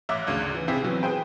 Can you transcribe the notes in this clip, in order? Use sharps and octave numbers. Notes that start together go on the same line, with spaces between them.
A1 E5 F5 D6 F#6
G#1 D2 C#3
E3
C3 C4 E4 G4 G#4
B2 E3 F#3 B3
G#4 B4 C5 G5